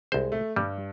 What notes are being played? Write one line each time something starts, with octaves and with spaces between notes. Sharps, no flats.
C2 G#3 C5
A3
G2 G3